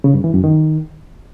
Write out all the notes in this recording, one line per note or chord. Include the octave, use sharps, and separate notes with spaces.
C#3
G2
E3
F#2
D#3